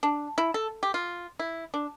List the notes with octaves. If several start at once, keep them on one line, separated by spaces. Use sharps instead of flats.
D4
E4
A4
G4
F4
E4
D4